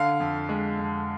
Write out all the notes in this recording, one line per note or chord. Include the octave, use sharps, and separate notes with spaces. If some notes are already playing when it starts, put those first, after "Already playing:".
Already playing: D3 F5
F2
G#3
F2